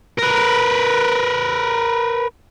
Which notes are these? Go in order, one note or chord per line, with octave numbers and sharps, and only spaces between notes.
A#4 B4